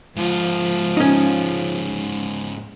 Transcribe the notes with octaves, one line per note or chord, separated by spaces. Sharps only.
G#2 F3 F4
C#4 D#4